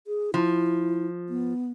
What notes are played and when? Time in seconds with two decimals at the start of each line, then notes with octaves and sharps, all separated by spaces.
0.07 G#4
0.34 F3 E4
1.29 B3